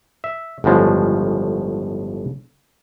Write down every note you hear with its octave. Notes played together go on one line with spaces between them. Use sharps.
E5
G1 A2 C#3 F3 G#3